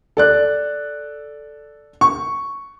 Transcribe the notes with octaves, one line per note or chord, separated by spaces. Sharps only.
A4 D5 F#6
C#6